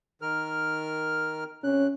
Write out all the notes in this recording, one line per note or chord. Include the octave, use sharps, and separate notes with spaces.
D#3 A#4 F6
C3 C#4 F#6